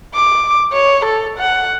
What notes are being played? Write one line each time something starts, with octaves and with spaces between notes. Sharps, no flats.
D6
C#5
A4
F#5